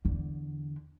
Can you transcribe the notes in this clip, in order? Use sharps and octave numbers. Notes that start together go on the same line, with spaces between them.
E2 D3